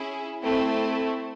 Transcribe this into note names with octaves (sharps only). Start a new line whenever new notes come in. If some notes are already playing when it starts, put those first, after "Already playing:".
Already playing: C#4 E4 G#4
A3 C4 E4